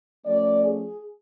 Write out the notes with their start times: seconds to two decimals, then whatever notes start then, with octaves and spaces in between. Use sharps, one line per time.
0.25 F3 A3 C#4 D5
0.64 G#4